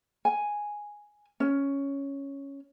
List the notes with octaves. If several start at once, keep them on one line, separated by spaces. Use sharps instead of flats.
G#5
C#4